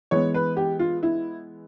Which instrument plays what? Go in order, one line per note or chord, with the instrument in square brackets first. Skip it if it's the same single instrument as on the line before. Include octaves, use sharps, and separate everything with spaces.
[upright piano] E3 G#3 B3 C#5
B4
G4
F4
E4